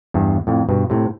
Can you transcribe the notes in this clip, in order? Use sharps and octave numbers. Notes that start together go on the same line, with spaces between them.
E2 G2
F2 A2
G2 B2
A2 C3